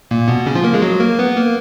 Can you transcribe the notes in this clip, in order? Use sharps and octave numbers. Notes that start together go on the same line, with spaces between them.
A#2 A#3
B2 B3
C#3 C#4
F3 F4
A#3 A#4
G#3 G#4
F#3 F#4
A#3 A#4
B3 B4
A#3 A#4